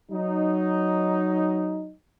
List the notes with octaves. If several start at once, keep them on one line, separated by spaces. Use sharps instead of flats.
F#3 D#4